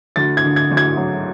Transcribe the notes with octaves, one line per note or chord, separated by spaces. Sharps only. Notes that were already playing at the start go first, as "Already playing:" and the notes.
D2 A6
G#6
D3
G#6
D2
G#6
F#3